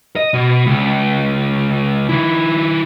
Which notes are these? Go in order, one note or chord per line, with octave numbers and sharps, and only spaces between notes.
D#5
B2
C#2
D#3 E4